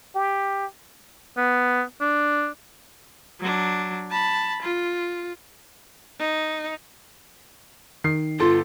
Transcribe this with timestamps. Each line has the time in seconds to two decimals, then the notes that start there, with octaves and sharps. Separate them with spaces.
0.15 G4
1.37 B3
2.00 D4
3.40 F#3 D4
4.11 A5 B5
4.63 F4
6.19 D#4
8.04 D#3 C7
8.39 G1 F4 A4 C6